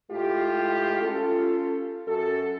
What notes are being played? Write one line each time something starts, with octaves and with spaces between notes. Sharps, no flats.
A2 G#3 F4 G4
C#4 F4 A4
F#2 F#4 A4